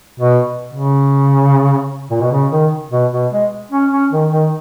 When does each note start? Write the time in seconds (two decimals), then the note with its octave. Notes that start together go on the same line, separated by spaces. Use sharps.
0.20 B2
0.74 C#3
2.11 A#2
2.21 B2
2.32 C#3
2.52 D#3
2.92 B2
3.13 B2
3.32 G#3
3.72 C#4
3.91 C#4
4.12 D#3
4.32 D#3